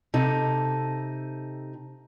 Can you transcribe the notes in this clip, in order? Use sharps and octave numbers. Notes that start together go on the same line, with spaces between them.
C3 D#4 A4